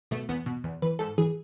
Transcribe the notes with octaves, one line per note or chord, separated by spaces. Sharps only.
B2 A3
E2 B3
B2
E2
E3 B4
G#2 A4
E3 G#4